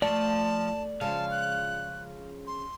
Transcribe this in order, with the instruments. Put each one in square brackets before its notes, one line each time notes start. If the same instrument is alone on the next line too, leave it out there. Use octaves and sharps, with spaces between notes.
[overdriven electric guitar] F3 [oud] A3 [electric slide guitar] D5 [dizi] A5
[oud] C#3 F3 G#3 [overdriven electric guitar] F5 [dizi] A5
[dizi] F#6
C6